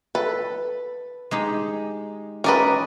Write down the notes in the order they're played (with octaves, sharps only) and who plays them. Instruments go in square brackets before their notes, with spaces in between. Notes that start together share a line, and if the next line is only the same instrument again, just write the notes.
[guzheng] A4 [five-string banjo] B4
[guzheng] G#3 D#4 G4
[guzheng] C#4 D5 D#5 [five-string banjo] A#4 B4